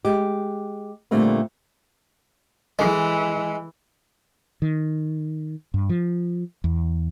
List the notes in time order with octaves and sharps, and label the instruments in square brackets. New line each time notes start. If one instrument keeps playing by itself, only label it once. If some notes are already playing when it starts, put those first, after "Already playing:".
[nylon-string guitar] G#3 G4
A#2 D3 G3 A3 A#3 C4
[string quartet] E3 [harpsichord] G#3 [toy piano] G#4 A4 D#5
[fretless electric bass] D#3
G2
F3
E2